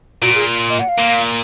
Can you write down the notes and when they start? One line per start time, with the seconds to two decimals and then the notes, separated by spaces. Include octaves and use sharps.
0.22 A#2 F#4
0.35 G#4
0.70 D#5
0.79 F#5
0.89 F5
0.98 A#2